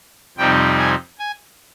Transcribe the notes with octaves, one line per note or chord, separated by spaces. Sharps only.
F2 C3 G3 C4 D#4 G5
G#5
G#5